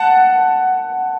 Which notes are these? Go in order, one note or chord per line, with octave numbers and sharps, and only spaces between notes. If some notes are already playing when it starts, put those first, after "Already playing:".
Already playing: F#5 A5